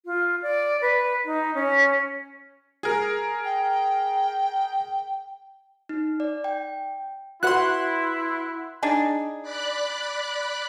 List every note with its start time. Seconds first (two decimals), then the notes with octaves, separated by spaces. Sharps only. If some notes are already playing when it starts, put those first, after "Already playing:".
0.05 F4
0.42 D5
0.82 B4
1.25 D#4
1.55 C#4
2.83 G#4 A#4
3.45 G5
5.89 D#4
6.20 D5
6.44 G5
7.43 E4 F#4 B4 F#5 C6 F#6
8.83 D4 D#4 G#4
9.42 D5 B5 F#6